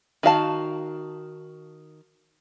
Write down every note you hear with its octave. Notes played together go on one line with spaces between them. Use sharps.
D#3 F#4 F5 A5